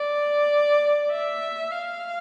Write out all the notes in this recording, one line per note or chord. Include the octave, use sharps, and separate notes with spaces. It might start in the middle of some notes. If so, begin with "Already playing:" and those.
Already playing: D5
E5
F5